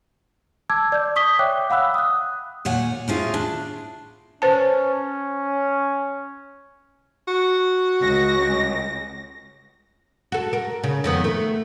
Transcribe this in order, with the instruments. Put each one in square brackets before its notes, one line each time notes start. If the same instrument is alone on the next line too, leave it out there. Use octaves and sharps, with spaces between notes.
[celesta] A5 D6 E6 G#6
D5 G6
C#6 D#6 B6 G7
C#5 E5 G5 D6 F#6
F5 F#5 B5 E6 F#6
D#6 F#6
[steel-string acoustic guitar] A#2 C#5 F#5 G#5
A2 C#4 F4 G#4
D4
[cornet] C#4 [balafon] B4 C5 A5
[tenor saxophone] F#4
[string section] C#2 A#6
[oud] F#4 A4
A#4
C#3
F2 D#3 B3
A3